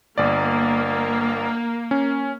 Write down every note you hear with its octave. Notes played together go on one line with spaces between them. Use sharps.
G1 A#3 D5
C#4